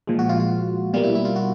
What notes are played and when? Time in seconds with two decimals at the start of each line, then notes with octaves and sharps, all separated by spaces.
0.07 A#2 F3 G#3
0.19 F#4
0.29 F4
0.40 F4
0.93 B2 G3 A#3 F4
1.04 E4
1.15 E4
1.25 F4
1.36 F#4